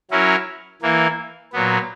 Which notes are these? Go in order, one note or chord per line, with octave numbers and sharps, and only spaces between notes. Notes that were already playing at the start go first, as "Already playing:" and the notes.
F#3 C#4 E4 A#4
E3 A#3 E4
A#2 F#3 B3